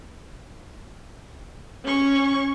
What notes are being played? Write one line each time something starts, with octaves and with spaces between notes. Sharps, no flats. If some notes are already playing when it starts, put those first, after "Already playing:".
C#4 C#6